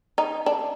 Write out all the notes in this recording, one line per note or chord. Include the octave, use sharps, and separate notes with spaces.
D#4
D4